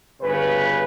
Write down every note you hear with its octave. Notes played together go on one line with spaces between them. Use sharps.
G1 C#3 B4